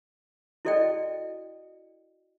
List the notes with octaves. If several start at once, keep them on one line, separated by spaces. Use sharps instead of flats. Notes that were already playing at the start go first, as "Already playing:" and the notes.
E4 F#4 A4 D5 D#5 G5